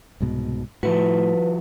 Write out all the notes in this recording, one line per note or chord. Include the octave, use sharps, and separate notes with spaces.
C2 G#2 B2
A2 F3 E4 F#4 B4